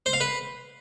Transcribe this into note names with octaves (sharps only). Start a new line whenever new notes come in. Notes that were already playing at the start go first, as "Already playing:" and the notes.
C5
F5
B4